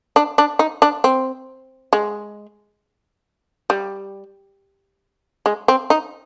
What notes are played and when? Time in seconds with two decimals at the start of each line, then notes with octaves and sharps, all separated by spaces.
0.16 D4
0.38 D4
0.59 D#4
0.82 D4
1.04 C4
1.93 G#3
3.70 G3
5.46 G#3
5.68 C4
5.90 D#4